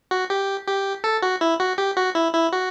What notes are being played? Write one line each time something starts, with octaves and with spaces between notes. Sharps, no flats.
F#4
G4
G4
A4
F#4
E4
F#4
G4
F#4
E4
E4
F#4